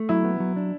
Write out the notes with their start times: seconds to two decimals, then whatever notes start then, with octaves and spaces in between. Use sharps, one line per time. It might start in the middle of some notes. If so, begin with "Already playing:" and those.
Already playing: A3
0.09 F#3 E4
0.24 B3
0.40 F#3
0.56 D4